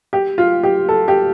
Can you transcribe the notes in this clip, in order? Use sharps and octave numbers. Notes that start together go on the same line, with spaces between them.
G4
F4
G4
A4
G4